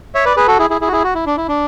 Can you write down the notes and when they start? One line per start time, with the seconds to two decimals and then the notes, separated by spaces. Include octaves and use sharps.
0.15 C#5 E5
0.25 B4 D5
0.37 G#4 B4
0.48 F#4 A4
0.59 E4 G#4
0.70 E4 G#4
0.81 E4 G#4
0.88 F#4
0.93 E4 G#4
1.04 F#4
1.15 E4
1.26 D4
1.37 E4
1.48 D4